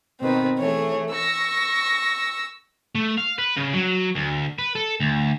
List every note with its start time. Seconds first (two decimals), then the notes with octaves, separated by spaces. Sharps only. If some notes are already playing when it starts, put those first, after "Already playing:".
0.20 B2 D#3 C4 B4
0.59 E3 A3 G#4 C#5
1.13 C#6 E6 A#6
2.95 A3
3.18 F5
3.39 B4
3.57 C#3
3.74 F#3
4.16 D2
4.59 B4
4.75 A4
5.00 D2